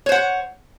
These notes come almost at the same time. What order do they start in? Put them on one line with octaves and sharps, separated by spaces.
C#5 C5 F#5